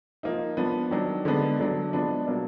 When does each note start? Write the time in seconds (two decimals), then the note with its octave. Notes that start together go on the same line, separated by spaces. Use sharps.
0.23 F3 A#3 D#4
0.57 F3 B3 D4
0.91 D#3 F#3 D4
1.25 D3 G#3 B3 D4
1.60 D3 F#3 D4
1.93 F3 G#3 B3 D4
2.27 B2 F#3 A#3 D4